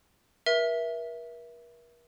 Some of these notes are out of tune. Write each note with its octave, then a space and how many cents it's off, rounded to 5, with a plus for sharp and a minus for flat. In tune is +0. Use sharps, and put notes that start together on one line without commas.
A#4 +45 E5 +0